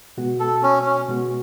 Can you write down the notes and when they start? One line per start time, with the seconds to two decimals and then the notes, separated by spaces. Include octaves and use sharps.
0.17 B2 G#3 B3 F#4
0.40 A4
0.63 C#4
0.86 C#4
1.08 B2 G#3 B3 F#4